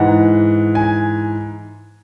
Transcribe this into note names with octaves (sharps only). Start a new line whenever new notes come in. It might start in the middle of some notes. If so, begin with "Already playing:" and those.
Already playing: G#2 E3 F#5
G#5